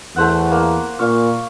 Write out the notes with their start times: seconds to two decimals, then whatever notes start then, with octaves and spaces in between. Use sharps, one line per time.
0.16 E2 A3 C5 F#5
0.51 A#3
0.99 A#2 F5 C#6